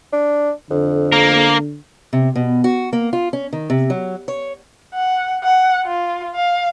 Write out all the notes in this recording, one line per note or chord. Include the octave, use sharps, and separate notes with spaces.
D4
F2 D3
A#3 A#4
C3
B2
F#4
A#3
F4
C#4
D#3
C3
F#3
C#5
F#5
F#5
F4
F5